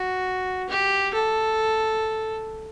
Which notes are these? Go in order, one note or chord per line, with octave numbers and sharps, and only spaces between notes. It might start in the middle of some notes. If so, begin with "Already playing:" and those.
Already playing: F#4
G4
A4